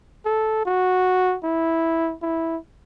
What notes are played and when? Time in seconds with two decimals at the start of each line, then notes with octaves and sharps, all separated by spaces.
0.25 A4
0.65 F#4
1.43 E4
2.22 E4